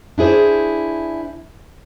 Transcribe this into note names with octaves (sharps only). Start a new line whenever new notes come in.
D4 E4 G#4 C5